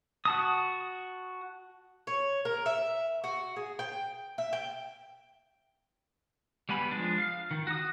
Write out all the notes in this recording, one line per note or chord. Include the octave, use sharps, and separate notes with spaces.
F#4 A5 D#6
C#5
A#4
E5
F#4
G#4
G5
E5
G5
G3 B3 G#5 B5
F3 G#3 D4
F5
D#3
F#4 D#6